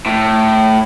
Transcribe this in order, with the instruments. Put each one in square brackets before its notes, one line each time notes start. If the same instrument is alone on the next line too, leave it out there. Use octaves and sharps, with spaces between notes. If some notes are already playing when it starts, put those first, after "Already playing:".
[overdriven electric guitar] A2